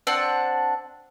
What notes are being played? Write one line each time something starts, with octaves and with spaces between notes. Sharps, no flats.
C4 D4 F#5 A5